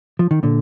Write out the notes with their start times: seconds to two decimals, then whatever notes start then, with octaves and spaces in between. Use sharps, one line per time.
0.19 F3
0.31 D#3
0.43 A#2 D3